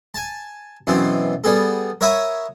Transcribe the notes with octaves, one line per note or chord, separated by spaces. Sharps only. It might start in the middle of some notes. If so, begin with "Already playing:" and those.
G#5 A5
F#2 B2 E3 C4
G3 B3 G#4 A4
A#4 C#5 E5 F#5 B5 D#6